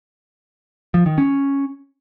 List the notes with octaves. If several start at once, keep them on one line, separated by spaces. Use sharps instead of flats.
F3
D#3
C#4